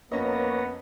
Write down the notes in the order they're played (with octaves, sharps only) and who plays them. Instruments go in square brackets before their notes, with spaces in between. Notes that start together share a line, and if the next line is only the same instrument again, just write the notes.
[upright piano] F2 C#4 D#5 [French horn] A#3 [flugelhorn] B3 [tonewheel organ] B4 C#5 A#5